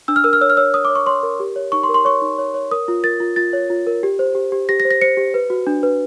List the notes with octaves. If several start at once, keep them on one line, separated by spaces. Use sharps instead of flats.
D4 E6
F6
A#4 E6
F6
C#5 E6
F6
C#5 E6
C#5 D#6
D6
C#5
C#6
C#5 C6
A#4
G4
C#5
D#4 C#6
C6
A#4
C6
C#5 C#6
D#4
C#5
C#5
A#4 D#6
F4
A#4 A6
F4
F4 A6
C#5
F4
A#4
G4
C5
G4
G4
G4 A#6
A#6
C5
A#6
C5 C#7
G4
B4
F#4
D4
B4